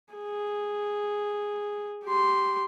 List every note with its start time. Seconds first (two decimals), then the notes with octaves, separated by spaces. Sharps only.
0.15 G#4
2.04 G4 C6